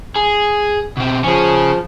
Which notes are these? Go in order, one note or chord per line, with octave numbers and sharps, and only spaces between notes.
G#4
B2 C4
F3 C#4 G#4